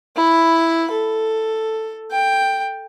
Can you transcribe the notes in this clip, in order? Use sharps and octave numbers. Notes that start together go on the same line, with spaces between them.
E4 B5
A4
G5